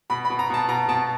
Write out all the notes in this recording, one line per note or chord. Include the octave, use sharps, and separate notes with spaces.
B2 B5
B5
B2
A#5
B2 A5
B2 A#5
B2 A5